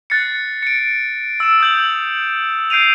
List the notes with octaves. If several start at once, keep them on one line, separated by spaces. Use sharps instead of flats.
F#6 A6 A#6 C7 C#7
C#7 D7
E6 E7
D#6 G6 F#7
G6 C7 D7 D#7 F7